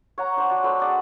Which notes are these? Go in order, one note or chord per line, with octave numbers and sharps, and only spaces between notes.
C#5 F#5 A#5
D4 C5 C#5
D4 F#4
A3 B4 C5 B5
G#4 D5 F#5